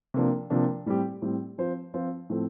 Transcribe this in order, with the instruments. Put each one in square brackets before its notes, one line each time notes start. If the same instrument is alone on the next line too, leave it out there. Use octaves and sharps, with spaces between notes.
[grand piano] C3 F3 A#3 D4
C3 F3 A#3 D4
A2 G3 C4 G4
A2 G3 C4 G4
F3 C4 F4 C5
F3 C4 F4 C5
A2 F3 A3 C4